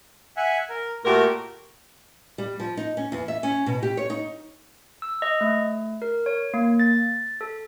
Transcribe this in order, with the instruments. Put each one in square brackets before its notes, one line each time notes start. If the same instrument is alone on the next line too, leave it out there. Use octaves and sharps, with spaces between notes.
[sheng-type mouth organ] E5 F#5 G#5
A#4
[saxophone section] A#2 G4 A#4 [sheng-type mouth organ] A3 F#4
[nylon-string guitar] G3
F3
D#4
C#4
E2
E5
C#4
B2
G4
C#5
D#4
[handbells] E6
D#5
A3
A#4
C#5
A#3
A6
A4